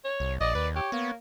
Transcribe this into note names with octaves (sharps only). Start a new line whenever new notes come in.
C#5
C2
A#1 D5 D#5
D#2 B4
G4 C#5
A#3 B3